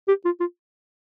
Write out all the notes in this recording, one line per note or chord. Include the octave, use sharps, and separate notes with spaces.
G4
F4
F4